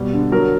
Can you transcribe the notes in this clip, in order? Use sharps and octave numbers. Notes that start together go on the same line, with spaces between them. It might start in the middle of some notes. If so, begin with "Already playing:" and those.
Already playing: B2 G3
D3
F#3 A#4